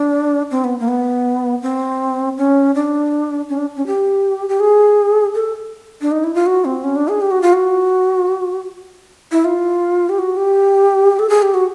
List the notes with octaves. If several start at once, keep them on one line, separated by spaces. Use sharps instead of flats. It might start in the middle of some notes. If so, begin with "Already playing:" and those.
Already playing: D4
C4
B3
A#3
B3
C4
C#4
D4
C#4
D4
C#4
G4
G4
G#4
A4
D4
D#4
E4
F4
F#4
C4
C#4
D4
G#4
G4
F#4
F4
F#4
E4
F4
G4
F#4
G4
A4
G#4
G4
F#4